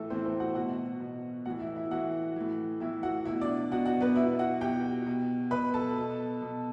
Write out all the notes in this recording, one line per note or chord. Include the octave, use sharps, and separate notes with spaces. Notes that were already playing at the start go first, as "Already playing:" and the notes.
Already playing: A2 E3 A3 A4
A2 E3 C4 C5
C4 C5
F#4 F#5
B2 F#4 F#5
B2
A2 E3 F#4 F#5
E4 E5
E4 E5
A2 E3 F#4 F#5
A2 E3
A2 E3 E4 E5
F#4 F#5
B2 E4 E5
D4 D5
B2 F#4 F#5
F#4 F#5
B3 B4
B2 E4 E5
F#4 F#5
B2 G4 G5
B2
B2 B4 B5
A4 A5
B2
B2